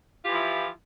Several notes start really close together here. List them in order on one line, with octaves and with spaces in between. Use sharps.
F4 G4 E3 F3 E4